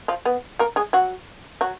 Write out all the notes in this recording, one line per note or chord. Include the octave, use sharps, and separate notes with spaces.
F3 F4
B3 B4
A#3 A#4
G#3 G#4
F#3 F#4
F#3 F#4